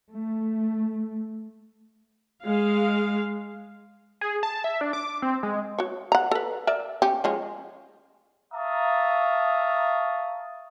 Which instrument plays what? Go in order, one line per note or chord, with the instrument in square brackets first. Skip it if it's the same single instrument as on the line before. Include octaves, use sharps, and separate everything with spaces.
[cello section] A3
[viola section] G#3 F5
[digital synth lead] G#4
A5
E5
D4
D6
C4
G#3
[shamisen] F#4 C#5
F#5 A#5
A4 B4
A#4 D5 E5
C#4 G4
F3 G#3 C#4
[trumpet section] E5 F5 A5 A#5 C#6 D#6